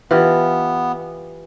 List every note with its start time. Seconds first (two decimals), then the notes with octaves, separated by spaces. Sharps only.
0.11 E3 B3 F4 G4